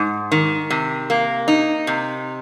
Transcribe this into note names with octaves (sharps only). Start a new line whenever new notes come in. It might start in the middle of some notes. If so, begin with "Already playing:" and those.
Already playing: G#2
D#3
C3
A#3
D#4
C3